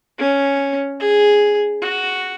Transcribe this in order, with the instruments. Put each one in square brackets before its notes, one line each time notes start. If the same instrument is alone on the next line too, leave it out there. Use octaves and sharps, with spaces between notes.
[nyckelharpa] C#4
G#4
F#4